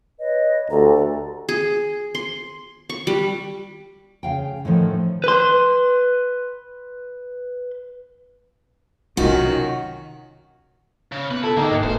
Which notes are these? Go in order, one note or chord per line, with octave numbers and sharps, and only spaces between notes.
B4 C#5 D#5
D2 G4 A4 A#5
G#4
C6
C#6
G3
C#3 F5 G5
A2 D3 D#3 F3
B4 C6
B1 C3 D#3 F#3 C#4 D#4 F4 F#4
C#3
B3 B4
A#2 E4 A4
D3 A#3 D#4 G#4 A4 D#5 G5
G#2 A#4 F#6 C#7
F#1 B2 E3 A3 C5